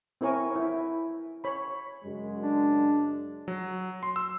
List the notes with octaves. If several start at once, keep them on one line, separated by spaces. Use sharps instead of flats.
C4 E4 A#4 C#5 G#5
E4
C#5 B5
F#2 C#3 G#3
D4
F#3
C6
E6